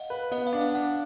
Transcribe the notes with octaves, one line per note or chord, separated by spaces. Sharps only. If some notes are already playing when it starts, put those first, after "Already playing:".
Already playing: D#5 F5 F#5
B4
B3 D#5
F5
D4
F#5
D4 F#5